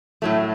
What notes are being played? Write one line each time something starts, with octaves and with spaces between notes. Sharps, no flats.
A2 F#3 A3